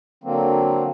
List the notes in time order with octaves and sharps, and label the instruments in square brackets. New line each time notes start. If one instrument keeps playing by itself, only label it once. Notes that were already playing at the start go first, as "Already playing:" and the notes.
[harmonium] D3 F#3 A#3 C4